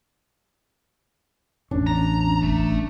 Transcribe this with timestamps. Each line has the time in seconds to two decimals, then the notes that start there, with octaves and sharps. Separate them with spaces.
1.71 A1 E2 C#4 D4
1.87 A#5
2.43 F#1 A3